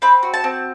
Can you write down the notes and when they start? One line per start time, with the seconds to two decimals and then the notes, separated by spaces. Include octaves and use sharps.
0.02 C4 B5
0.23 F#4
0.34 A5
0.44 C4